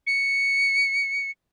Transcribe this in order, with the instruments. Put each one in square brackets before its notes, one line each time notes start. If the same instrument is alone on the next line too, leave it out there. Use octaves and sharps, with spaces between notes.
[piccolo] C#7